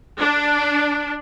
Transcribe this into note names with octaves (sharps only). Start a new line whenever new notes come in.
D4